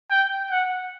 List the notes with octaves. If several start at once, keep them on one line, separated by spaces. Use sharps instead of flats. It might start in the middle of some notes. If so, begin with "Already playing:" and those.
G5
F#5